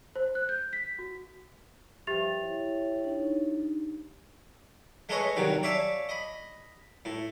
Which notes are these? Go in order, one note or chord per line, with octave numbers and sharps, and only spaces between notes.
C5
F#6
G6
B6
F#4
G2 F3 G4 E5 G5 A6 F7
E4 C#5
D4 D#4
G#3 A3 G#4 B4 C#5 D#5
G2 C3 D#3 F#3
C#5 D5 E5 F5 G#5 A5
D#5 B5
A2